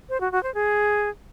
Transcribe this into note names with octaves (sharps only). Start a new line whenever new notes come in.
C5
F#4
F#4
C5
G#4